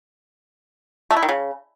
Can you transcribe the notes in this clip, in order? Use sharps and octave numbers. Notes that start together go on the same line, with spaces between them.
A3
E4
D#3
C#3